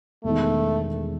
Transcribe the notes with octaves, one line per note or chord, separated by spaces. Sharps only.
E1 E2 D#3 A3